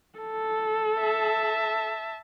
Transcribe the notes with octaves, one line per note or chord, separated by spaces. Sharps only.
A4
E5 A5